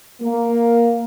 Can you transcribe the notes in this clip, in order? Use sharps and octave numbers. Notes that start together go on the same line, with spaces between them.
A#3